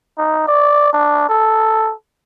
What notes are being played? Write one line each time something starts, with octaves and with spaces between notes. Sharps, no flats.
D#4
D5
D4
A4